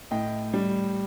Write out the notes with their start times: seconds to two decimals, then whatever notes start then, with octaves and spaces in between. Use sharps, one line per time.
0.11 A2 D#5 G5
0.54 G3